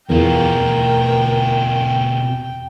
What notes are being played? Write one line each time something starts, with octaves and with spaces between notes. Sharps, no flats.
E2 B2 F4 A#4 G5